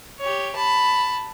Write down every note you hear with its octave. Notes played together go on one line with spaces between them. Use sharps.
G4 C#5
A5 B5